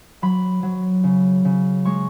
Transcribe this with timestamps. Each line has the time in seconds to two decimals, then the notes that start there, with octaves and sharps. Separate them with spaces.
0.22 F#3 B5
0.63 F#3
1.04 C#3
1.45 C#3
1.85 G#3 C#6